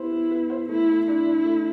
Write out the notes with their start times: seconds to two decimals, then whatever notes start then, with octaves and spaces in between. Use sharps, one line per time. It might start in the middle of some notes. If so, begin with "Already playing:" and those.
Already playing: B3 E4 G4 C5
0.12 B3
0.31 B3
0.50 C5
0.69 A3 E4
0.88 A3
1.07 D4 E4
1.26 D4
1.45 A3